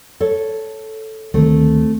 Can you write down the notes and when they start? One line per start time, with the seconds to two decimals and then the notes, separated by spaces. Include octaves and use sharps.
0.20 A4 C#5
1.34 D2 D#3 A3 C4